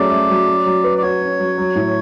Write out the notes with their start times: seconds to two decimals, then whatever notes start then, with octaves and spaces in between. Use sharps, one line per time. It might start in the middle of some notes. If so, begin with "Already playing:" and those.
Already playing: F#3 A3 C#4 G#4 D5
0.11 A3
0.30 F#3
0.47 C#4
0.66 F#3
0.84 B4
0.98 D5
1.02 F#4 C#5
1.21 C#4
1.39 F#3
1.58 F#3
1.75 A2